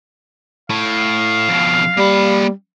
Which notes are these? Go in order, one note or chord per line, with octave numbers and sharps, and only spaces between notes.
A2 F5
F2 B2
G3 A#3 B5